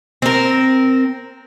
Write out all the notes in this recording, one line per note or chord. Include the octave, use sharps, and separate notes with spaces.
C4 A#4